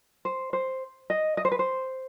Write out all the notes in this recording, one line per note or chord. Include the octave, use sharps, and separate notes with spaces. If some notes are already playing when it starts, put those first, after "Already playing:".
C5
C5
D#5
D#5
C5
B4
C5